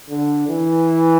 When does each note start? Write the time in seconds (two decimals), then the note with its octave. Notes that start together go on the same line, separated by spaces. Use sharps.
0.10 D3
0.48 E3